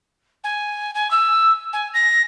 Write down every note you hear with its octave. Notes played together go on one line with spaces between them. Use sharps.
G#5
G#5
E6
G#5
A#6